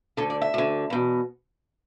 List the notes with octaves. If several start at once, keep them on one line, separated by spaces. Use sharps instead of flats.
D2 D3 A4
D5
E5
D2 D3
E2 B2